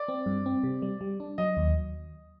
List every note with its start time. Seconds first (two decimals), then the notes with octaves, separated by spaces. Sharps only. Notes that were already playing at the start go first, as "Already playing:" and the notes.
Already playing: D5
0.08 C4
0.26 G2
0.46 C4
0.63 C3
0.82 G3
1.01 G3
1.20 D4
1.38 F#3 D#5
1.57 D#2